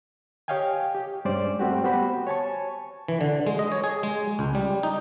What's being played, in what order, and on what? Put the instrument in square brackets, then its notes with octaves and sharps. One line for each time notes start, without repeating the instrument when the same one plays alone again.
[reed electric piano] G4 C#5 D#5 F5 G5 G#5
G4
G2 G#3 C#4 C5 D5 D6
G3 A3 C4 F#4 G4
B3 F#4 G4 C5 B5
C#5 G#5 A5 C#6
[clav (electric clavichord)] E3
D3
G#3
D#5
C#5
G#4
G#3
C#2
G3
D#4